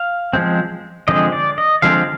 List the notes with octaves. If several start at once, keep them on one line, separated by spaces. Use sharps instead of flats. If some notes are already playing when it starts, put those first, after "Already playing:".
Already playing: F5
F3 G#3 C4
D3 F3 G#3 C4 D#5
D5
D#5
D3 F3 G#3 C4 F5